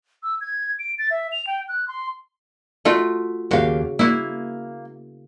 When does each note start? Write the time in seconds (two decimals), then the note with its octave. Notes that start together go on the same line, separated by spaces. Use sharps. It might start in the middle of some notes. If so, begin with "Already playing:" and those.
0.23 E6
0.41 G#6
0.79 D7
0.98 A6
1.11 E5
1.32 F7
1.47 G5
1.68 F#6
1.88 C6
2.85 A3 F4 F#4
3.51 D#2 C#3 F#4 G4 F5
3.99 A#3 E4 F#4